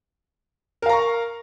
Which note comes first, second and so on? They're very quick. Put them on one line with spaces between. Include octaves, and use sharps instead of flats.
A#4 F5 A#5 C#6